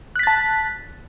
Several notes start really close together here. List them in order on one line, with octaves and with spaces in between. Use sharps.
F#6 B6 A6 A5